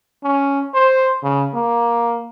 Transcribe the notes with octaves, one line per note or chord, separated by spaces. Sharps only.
C#4
C5
C#3
A#3